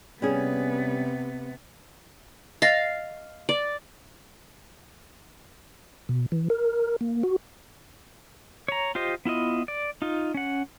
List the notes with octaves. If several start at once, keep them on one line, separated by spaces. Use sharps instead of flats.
C3 G3 B3 C#4 G#4
D#5 F5 A6 A#6
D5
B2
E3
A#4
A#3
F#4
C#5 A#5
F4 G4 C5 D#5
B3 E4 F4 D#5
D5
D#4 F4
C#4 F#5